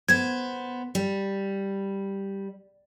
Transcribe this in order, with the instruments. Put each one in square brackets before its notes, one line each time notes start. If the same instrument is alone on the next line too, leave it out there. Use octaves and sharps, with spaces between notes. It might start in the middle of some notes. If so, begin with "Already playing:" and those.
[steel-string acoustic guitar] B3 C5 [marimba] G#6
[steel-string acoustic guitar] G3